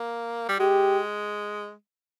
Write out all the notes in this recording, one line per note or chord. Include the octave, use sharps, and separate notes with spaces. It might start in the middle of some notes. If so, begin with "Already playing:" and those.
Already playing: A#3
G3
G#3 G4